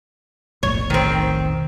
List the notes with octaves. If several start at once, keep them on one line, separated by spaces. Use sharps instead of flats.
F1 B1 A2 C#5
D#3 C4